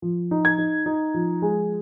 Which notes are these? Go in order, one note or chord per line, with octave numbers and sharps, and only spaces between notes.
F3
D#4
G#6
D#4
D#4
F3
G#3